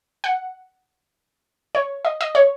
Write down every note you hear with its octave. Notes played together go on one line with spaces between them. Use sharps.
F#5
C#5
D#5
D#5
C#5